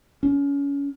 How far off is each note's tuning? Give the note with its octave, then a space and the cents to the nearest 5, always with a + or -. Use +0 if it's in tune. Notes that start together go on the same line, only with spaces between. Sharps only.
C#4 +25